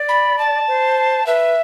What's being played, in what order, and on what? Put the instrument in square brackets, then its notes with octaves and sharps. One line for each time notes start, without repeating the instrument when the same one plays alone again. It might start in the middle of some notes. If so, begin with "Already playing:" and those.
Already playing: [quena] D5
[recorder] B5
A5
[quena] C5
[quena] B4 [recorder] E5